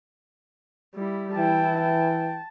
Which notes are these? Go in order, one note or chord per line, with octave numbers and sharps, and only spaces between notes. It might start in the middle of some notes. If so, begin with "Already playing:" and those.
G3 E4
E3 E4 G5 A5
G5